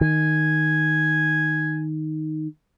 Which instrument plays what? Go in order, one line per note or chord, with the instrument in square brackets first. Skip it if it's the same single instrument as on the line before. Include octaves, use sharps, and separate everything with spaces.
[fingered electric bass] D#3 [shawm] G#5